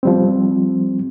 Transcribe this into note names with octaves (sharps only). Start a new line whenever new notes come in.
F3 G3 C4